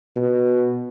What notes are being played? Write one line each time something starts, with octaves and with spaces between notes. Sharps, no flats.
B2